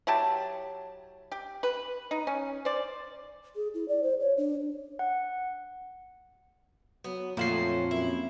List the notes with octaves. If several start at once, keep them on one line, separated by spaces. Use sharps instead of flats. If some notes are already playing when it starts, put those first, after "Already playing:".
F#3 E4 G4 A5
G4
B4
D#4
C#4
C5 D5
G#4
E4
D5
C5
C#5
D4
F#5
F#3 B3
F2 A#2 F3 F#3 A3 C#4 F4 C7
F#2 E4